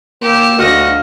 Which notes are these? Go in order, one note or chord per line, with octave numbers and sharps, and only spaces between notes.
A#3 G4 E6
D2 F#4 D#5 F5